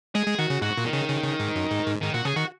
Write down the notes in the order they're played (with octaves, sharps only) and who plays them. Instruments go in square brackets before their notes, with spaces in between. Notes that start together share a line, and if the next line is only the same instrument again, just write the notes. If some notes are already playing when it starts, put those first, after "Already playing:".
[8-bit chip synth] G#3 [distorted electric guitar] G#4
[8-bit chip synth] G#3
[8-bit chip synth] D#3 [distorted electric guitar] F#4
[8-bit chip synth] C#3
[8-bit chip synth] G#2 [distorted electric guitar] F#4
[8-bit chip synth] A#2
[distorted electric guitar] D#3
[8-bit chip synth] C#3
C#3
C#3
G#2
F#2
G#2
G#2
[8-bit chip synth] G#2 [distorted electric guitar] D#3
[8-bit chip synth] A#2 [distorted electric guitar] F#4
[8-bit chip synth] C#3 [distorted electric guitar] G#4
[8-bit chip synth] D#3 [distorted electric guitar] F#4